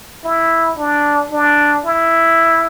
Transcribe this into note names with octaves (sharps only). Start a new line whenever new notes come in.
E4
D4
D4
E4